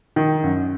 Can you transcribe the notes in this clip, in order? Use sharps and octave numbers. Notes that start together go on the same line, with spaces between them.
D#3
F#2